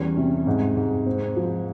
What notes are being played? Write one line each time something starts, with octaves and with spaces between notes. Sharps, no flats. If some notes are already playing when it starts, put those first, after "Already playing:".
Already playing: E2 G3 C#4
C3
G#2
G#2
C4
F3